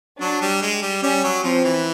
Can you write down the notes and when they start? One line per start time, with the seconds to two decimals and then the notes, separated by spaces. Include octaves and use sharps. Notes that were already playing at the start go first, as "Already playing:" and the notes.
0.20 F#3 D4
0.41 G3
0.62 G#3
0.82 G3
1.02 G3 C#4
1.24 F#3
1.43 F3 C4
1.64 E3